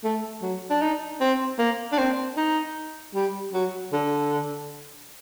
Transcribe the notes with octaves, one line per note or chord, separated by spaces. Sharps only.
A3
F#3
D4
D#4
C4
A#3
D4
C4
D#4
G3
F#3
D3